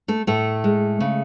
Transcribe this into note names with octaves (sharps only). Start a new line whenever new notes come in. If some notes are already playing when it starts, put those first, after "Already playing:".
A3 A4
A2 A3 A4
G#3
C#3